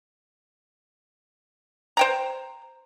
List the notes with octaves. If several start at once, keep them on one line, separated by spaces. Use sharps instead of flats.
C5 G5 A#5